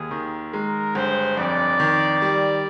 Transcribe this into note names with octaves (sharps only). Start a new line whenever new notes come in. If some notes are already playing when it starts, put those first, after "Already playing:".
Already playing: D#2 G#4
D#3
G#3 A#4
G1 C5
F2 D5
D#3
G3